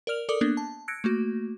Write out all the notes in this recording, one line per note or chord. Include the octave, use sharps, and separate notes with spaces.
A#4 D5 F6 F7
A4 A#4 D5 D6 D#6
A#3 B3 D4
A5
E6 F#6 G#6 A#6 C#7 D7
A3 A#3 F#4